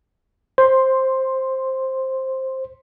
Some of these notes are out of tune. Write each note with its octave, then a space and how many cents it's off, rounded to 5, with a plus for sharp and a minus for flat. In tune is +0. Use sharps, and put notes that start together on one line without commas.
C5 +10 C6 +0